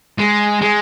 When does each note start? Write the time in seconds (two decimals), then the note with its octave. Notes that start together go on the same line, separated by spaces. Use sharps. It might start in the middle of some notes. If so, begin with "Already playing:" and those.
0.18 G#3
0.61 G#3